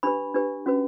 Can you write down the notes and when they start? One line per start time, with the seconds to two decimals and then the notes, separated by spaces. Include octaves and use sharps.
0.03 D4 G4 B4 B5
0.34 D4 G4 B4
0.66 C#4 F#4 B4